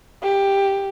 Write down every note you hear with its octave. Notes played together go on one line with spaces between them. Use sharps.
G4